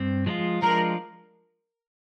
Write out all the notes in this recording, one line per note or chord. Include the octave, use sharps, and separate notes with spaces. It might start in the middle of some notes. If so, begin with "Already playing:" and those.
Already playing: G2 C4
F3 G#3 D4 F4
F3 G#3 D4 F4 A#4